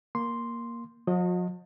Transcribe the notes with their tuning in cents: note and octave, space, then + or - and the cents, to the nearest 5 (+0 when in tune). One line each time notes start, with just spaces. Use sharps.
A#3 +5 C6 +0
F3 +45 F#4 -40 D#5 +0